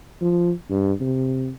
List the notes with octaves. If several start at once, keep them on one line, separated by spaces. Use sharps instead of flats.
F3
G2
C3